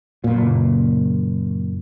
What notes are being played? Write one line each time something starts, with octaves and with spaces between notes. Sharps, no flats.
F#1 A#2